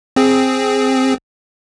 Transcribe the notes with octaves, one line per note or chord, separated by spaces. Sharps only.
C4 G#4